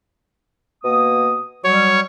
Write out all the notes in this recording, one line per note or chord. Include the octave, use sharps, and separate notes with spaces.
B2 A#3 D#6
F#3 G3 C#5